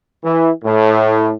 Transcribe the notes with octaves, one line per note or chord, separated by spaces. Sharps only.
E3
A2